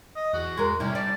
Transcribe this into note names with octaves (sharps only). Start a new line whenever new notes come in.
D#5
E2 F#4
G#3 A#4
C3 G3 C#4 E4
D5 A5